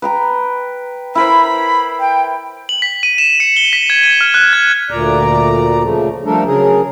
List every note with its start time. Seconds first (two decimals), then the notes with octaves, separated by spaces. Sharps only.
0.02 B4 G5 A#5
1.15 E4 A#4 C5 B5
2.00 G5
2.69 F#7
2.82 B6
3.03 D#7
3.18 E7
3.40 C#7
3.57 G7
3.73 B6
3.90 G#6
4.03 D#7
4.21 F6
4.34 F#6
4.53 G#6
4.91 D2 A#2 D5 A#5
5.83 C#3 F3 A3
6.25 F3 G3 A3 D4 A4 A#4
6.47 C#3 F#3 G#4 A#4